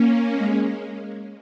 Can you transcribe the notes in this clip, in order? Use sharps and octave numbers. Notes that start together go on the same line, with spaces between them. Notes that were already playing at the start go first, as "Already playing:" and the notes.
Already playing: A#3 C#4
G#3